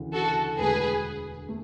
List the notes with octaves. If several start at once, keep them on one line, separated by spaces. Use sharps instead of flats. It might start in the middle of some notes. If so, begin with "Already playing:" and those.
Already playing: D2 C#3 E3
F#4 A4
E1 D2 D3 A3 G#4 B4
A3